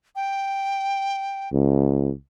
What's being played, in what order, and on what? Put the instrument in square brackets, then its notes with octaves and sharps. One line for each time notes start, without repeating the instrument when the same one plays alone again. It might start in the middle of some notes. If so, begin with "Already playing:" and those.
[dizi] G5
[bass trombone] C#2